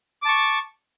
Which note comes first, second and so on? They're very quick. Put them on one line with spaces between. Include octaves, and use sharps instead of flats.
D6 A5 C#6